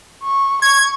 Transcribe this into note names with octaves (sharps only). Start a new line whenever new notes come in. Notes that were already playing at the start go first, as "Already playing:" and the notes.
C#6
C#6 G#6